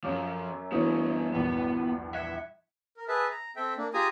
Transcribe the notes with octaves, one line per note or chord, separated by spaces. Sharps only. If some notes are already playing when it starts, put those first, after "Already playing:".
F#2 F3 C4 C#4 D6
E3 G3 B3 E4 F#4
A#1 E2 G2 B3
E5 F#6 G#6 C#7
A#4
G#4 B4 E5 A5
A#5
C4 A4 E5 G5
A#3 D4
F4 G4 G#4 G#5 A#5 D#6